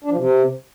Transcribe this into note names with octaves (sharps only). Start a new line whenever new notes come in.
D4
F3
C3